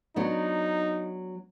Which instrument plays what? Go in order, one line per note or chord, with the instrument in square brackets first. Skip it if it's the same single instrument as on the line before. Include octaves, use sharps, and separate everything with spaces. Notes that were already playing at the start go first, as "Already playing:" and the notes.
[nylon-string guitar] F#3 B3 D4 [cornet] D#4